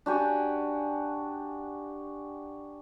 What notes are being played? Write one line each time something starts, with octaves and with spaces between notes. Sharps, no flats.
D4 F#4 G4 G#5